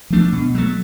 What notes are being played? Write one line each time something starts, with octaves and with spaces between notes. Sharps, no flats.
F3 A3 D4
B2
F#3 A3